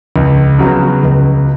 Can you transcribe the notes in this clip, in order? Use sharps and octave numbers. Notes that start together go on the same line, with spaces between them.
C#2
C#3 F#3 B3 F#4
C#2